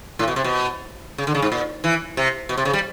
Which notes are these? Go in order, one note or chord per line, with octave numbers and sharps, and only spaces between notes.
A2
B2
C3
B2
C#3
D3
C#3
G#2
A#2
E3
C3
B2
C3
C#3
G3